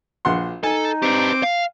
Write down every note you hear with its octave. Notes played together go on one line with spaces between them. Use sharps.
A#1 F#5 C6
D#4 A4 G#5
C4 G4 B4 D6
F5